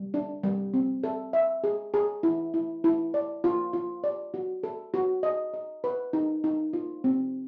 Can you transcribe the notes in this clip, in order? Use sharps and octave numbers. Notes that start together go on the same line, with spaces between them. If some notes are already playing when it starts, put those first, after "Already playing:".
Already playing: G3
D4
G3
C4
A4
E5
G#4
G#4
E4
E4
E4
D5
F4
F4
D5
F#4
A4
F#4
D#5
D#5
B4
D#4
D#4
F4
C4